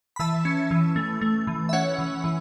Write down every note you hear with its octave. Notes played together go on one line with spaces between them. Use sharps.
B5
E3 E5 A5
C#4
E3
A3
A3
E3
E5
C#4 C#5 F#5
E3
E3